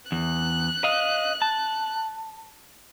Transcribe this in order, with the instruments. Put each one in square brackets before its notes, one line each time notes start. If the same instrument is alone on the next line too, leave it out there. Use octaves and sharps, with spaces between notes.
[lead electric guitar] E2 [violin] F#6
[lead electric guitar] D#5 F5
A5